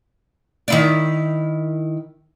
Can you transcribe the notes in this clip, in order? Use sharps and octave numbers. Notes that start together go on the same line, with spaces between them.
D#3 E4 D5